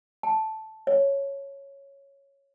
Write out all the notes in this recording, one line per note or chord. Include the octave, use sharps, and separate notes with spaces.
A5
C#5